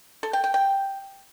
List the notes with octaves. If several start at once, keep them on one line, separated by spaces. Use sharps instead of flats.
A4
G5
G5
G5